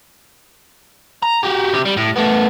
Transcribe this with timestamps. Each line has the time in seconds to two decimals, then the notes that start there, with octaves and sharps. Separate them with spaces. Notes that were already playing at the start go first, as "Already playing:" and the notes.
1.23 A#5
1.44 F#4 G4
1.74 C3 G4
1.85 G3
1.97 A2
2.16 A3 B3